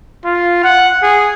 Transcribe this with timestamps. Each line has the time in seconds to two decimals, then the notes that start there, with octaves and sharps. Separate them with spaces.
0.25 F4
0.64 F#5
1.02 G#4